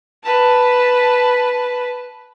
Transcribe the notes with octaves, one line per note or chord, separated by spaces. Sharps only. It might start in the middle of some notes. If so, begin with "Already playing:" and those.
B4 A5